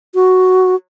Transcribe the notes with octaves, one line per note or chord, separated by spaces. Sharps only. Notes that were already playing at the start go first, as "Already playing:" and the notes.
F#4